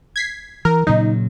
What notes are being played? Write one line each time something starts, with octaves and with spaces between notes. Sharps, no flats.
G#6 B6 C7
E3 A#4
A#2 C#3 F#3 D#4